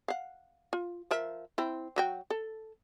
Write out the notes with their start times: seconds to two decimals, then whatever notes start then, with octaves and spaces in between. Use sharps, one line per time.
0.08 F5 F#5
0.73 F4
1.11 F3 A#4 E5
1.58 C4 E4
1.96 F#3 F#4 G5
2.30 A4